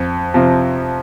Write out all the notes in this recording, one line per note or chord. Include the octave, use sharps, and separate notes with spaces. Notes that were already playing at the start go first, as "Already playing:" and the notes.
Already playing: F2
C3 F3